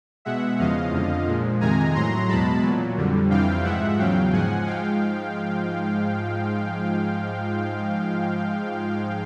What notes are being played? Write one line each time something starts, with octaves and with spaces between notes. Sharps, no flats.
B2 G#3 E5 F#5
E2 C#3 F3 G#3 D#5 F5
F2 D3 F3
A#2 F3 G#3
F2 C3 D#3 G#3 G#5 A#5
A2 F#3 A#5 C6
E2 B2 G#3 A5 B5
A#2 F#3
F2 D3 G3
F2 C3 E3 G3 F5 G5
G#2 F3 G#3 E5 F#5
E2 C#3 F#3 F5 G5
G#2 F3 G#3 F#5 G#5
G#2 F3 G#3 F5 G5